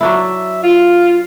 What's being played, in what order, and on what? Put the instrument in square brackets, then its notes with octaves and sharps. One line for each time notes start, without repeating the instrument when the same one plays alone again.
[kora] F#3 D4 E4 [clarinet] E5
[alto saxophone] F4 [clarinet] F5